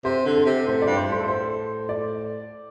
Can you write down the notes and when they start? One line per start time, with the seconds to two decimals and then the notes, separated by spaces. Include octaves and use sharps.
0.05 C3 C5
0.26 D3
0.36 A4
0.46 C3
0.67 A2 C5
0.82 G2 D5
0.96 C5
1.07 A2 C5
1.20 A4
1.28 C5
1.89 D5